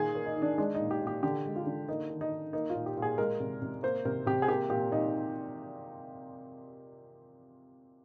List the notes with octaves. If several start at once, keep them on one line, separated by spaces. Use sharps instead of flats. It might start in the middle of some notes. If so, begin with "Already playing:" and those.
Already playing: A#2 D#3 G#4
A#3
D#4
D#3
D4
G#3 D4
A#2 D#4
G4
A#2
G4
D3 G4
G#3
F4
D3
A#3 D#4
D#3
D#4
D#3
A#3 D#4
F4
A#2
G4
A#2
G#4
G#3 A#4
C3
C3
A#3 C5
C3 A#4
C3 G4
G#4
A#3 G4
A#2 G4
A#2 D#4